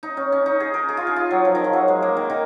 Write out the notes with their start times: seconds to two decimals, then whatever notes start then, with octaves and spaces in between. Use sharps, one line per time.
0.03 D#4
0.17 C#4
0.32 C#4
0.46 D#4
0.60 G#4
0.74 A#4
0.89 G#4
0.97 F4
1.07 G#4
1.16 F4
1.31 F#3
1.45 F3
1.55 D#3
1.64 F3
1.73 F#3
1.88 G#3
2.02 A#3
2.17 D#3
2.30 D#3